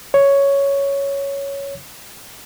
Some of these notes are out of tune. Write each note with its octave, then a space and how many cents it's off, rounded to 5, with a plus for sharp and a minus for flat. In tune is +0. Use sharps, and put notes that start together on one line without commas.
C#5 +5